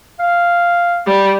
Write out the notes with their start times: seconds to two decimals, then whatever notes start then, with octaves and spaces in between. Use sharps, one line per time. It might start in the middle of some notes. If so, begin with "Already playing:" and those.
0.19 F5
1.06 G3